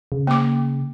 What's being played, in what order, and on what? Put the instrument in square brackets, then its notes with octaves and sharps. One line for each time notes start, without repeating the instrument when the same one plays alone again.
[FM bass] C#3
[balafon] A#3 D6